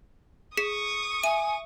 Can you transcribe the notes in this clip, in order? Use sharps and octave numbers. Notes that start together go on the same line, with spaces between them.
G#4 C#6 D#6 B6 C#7
E5 G#5 D#7